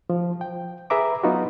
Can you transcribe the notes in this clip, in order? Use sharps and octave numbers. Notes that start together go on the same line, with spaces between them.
F3
G5
G#4 B4 E5 A#5 D6
F#3 B3 D#4 F4 F#4